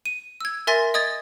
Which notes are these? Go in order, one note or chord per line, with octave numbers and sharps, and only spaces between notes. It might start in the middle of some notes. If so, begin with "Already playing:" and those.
D#7
E6 G#6
A#4 E5 G#5 C6 A6 A#6
D#5 D#6 G#6 A6